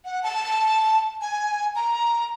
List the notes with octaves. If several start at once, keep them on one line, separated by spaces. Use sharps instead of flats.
F#5
A5
G#5
A#5